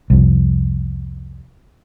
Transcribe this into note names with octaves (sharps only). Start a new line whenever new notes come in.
C2 F2